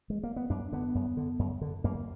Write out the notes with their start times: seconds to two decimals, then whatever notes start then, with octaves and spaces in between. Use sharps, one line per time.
0.10 G#3
0.23 A#3
0.36 B3
0.50 F#2 D4
0.73 D3 B3
0.95 F#2
1.17 D3
1.39 F#2
1.61 D3
1.84 F#2 A#3